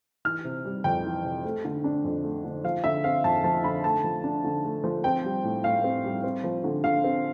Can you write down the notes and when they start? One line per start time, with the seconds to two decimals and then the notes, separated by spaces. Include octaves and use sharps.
0.25 E3 F6
0.44 C3
0.65 G3
0.84 F2 G5
1.05 E3
1.24 C3
1.44 A3
1.65 D3
1.84 D4
2.05 F2
2.24 A3
2.44 D3
2.64 F3 F5
2.84 D3 E5
3.04 C4 F5
3.24 F2 A5
3.44 F3 A5
3.64 D3 B5
3.84 A3 A5
4.04 F3
4.24 D4
4.44 D3
4.64 A3
4.84 F3
5.04 C4 G5
5.24 G3
5.43 A2
5.64 A2 F5
5.84 C4
6.04 G3
6.24 C4
6.44 F3
6.64 D3
6.84 D3 F5
7.04 C4